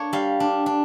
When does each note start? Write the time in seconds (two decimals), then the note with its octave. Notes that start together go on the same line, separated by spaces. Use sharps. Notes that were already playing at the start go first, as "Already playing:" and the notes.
Already playing: A#3 D4 C#5
0.13 G3 F5
0.40 D4
0.66 D4